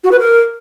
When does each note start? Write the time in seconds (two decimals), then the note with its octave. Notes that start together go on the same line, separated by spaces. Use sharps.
0.04 F#4
0.12 B4
0.19 A#4